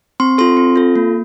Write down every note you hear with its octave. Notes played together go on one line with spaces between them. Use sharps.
C4 C6
F4 A4 C6
C4
F4 A4
A#3